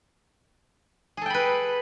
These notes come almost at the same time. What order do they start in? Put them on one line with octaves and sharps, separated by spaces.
G#4 A4 G5 B5 B4